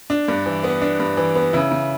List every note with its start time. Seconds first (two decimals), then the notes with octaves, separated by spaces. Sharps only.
0.10 D4
0.28 G2
0.46 E3
0.64 B3
0.82 D4
0.99 G2
1.17 E3
1.35 B3
1.53 C#3 E4
1.72 C#3